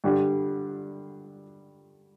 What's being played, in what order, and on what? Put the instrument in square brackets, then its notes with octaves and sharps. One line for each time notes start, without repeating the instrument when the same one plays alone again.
[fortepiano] G2 D3 G3